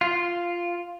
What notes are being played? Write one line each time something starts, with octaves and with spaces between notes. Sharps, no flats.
F4